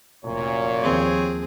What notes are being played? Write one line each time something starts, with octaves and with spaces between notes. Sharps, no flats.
F1 F#2 A#2 C#5
D#2 F3 C4 G#4